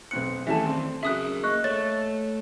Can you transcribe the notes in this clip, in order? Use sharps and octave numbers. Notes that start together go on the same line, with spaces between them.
B1 C4 F#6 C#7
D#3 E3 G3 A3 C#4 E5 A5
C4
C#3 F#3 G#4 A#4 E5 D#6 F#6
A#3 D#5 C#6 F#6
A3 C#5 A6